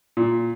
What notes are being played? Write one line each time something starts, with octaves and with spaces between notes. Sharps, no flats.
A#2